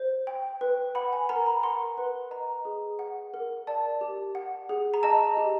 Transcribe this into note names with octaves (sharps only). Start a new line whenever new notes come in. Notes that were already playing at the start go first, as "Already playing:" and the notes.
Already playing: C5
G5
B4
F#5 B5
G#5
A#4 A#5
B5
F#5 C6
B4
D#5 A#5
G#4
F#5
A#4
D5 A5
G4
F#5
G#4
A#5
D#5 A5
G4